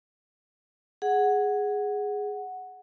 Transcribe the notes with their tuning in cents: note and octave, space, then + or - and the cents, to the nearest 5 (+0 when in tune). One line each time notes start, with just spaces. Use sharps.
G#4 +0 F#5 +0